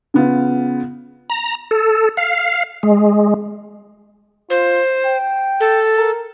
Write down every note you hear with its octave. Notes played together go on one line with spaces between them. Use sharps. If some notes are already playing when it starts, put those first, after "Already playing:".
C#3 B3 F4
A#5
A4
F5
G#3
F4 C5
G5
A4
A#4